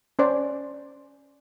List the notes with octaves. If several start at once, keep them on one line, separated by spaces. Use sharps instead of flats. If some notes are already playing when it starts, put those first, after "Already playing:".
C#4 C5 D5